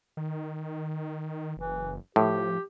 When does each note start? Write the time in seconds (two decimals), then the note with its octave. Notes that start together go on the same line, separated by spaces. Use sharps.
0.17 D#3
1.57 F#1 E3
2.16 A2 F3 G4